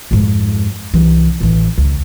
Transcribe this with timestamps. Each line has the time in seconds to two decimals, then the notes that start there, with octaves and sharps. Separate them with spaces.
0.11 F2 G#2
0.94 C2 E3
1.40 A1 E3
1.78 C#2